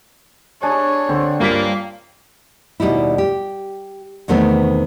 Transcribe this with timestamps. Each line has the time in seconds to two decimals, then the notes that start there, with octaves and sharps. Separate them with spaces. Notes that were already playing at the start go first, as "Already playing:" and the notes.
0.63 D4 G#4 C#5
1.09 D3 C4
1.40 G2 A#3 F4 B6
2.80 D#2 B2 G3 D#4 E4
3.18 G4
4.28 E2 C3 D#3 A3 B3 C4